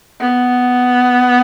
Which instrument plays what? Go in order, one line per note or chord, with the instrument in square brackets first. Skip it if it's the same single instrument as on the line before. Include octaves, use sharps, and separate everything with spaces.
[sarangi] B3